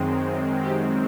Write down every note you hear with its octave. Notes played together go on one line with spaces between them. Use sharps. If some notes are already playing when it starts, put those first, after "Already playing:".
Already playing: F#2 D#3 G#3 C4
G4